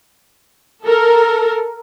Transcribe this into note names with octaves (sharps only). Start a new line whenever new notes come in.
A4 A#4